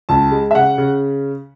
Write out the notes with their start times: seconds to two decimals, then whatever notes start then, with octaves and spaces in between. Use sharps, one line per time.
0.09 C#2 A5
0.31 G#3
0.51 E5
0.55 C#3 F#5
0.78 C#3